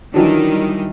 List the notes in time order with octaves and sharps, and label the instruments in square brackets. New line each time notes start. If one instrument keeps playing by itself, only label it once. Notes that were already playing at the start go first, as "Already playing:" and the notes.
[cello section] D#3 G3 [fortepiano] E3 F#3 D4